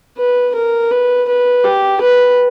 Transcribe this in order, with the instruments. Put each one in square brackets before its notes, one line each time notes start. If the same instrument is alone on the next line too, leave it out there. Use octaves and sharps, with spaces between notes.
[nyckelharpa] B4
A#4
B4
B4
G4
B4